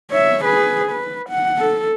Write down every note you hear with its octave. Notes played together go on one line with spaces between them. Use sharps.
C#5 E5
G#4 B4
B4
F#5
A4